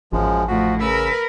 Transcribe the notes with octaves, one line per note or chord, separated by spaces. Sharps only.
A1 F#2 F3 G#3
F2 A2 F3 F#4
C#3 A#4 B4 E6